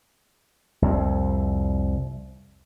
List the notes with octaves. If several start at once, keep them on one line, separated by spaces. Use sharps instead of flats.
C2 F2